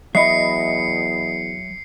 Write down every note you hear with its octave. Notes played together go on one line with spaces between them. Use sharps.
E2 F#3 D#5 E5 B5 C7 C#7